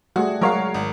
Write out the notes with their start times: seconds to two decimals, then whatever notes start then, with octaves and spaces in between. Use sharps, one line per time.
0.16 G3 A3 F#4 G#4
0.41 F#3 G#3 F#4 A#4 C#5 F5
0.74 G#1